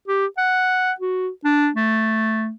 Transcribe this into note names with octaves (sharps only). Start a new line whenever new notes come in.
G4
F#5
F#4
D4
A3